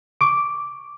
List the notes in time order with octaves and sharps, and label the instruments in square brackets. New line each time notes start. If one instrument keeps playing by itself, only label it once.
[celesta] C#6 D6 D7